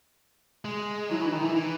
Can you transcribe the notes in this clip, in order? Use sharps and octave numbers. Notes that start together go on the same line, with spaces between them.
G#3
F#3 E4
E3 D#4
D#3
E4
E3
E3 D#4